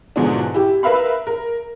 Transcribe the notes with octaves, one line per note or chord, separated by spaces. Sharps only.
E2 G#2 B2 D3 F3 D4
E4 G4
A#4 B4 E5 F5 B5
A#4